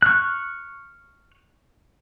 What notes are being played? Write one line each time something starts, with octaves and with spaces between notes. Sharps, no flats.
C#6 F6 F#6